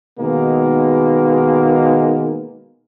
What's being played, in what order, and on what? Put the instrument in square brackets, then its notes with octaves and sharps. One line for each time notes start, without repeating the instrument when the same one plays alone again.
[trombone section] B2 D#3 G#3 A#3 B3